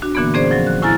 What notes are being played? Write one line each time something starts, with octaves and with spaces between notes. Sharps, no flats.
D4 F#4
A#2 D3 E3 A#3 B3
C4 C#4 G#4 C5 D5
F3 F#3
F#6
A2 E4 G#5 A#5 F6 A6